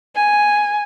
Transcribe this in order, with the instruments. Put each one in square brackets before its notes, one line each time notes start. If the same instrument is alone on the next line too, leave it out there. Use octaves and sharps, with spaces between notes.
[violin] G#5